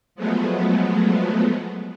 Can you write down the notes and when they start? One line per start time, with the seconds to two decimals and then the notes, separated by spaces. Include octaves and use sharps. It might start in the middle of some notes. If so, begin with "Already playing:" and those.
0.15 F3 F#3 G#3 A3 B3